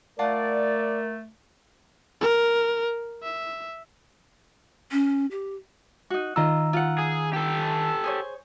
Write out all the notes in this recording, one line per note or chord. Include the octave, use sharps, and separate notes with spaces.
A3 F4 A#4 D5 F#5 A5
A#4
E5
C#4
G4
D#4 F#4
D#3 F4 D#5 A#5 E6
F4 F#5
G#4
G4 A4
G#4 C5 C#5